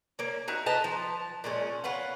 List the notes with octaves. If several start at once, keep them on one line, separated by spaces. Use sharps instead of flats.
A#3 C#4
D#4 E4 F#4
B4 D#5 A5 A#5
F3
A#2 G#3 C#4
C#4 F4 B4 F#5